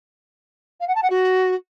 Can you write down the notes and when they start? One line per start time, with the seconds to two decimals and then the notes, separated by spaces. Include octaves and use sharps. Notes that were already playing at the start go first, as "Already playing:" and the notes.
0.80 F5
0.87 F#5
0.95 A5
1.02 F#5
1.10 F#4